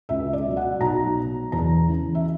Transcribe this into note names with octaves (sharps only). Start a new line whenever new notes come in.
C#2 E5
D5
B2 F#3
F#5
B1 A#5
B2 F#3
E2 A#5
C#3 E3
E5